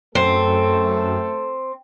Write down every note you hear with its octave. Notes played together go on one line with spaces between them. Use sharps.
F#2 A3 C4 A4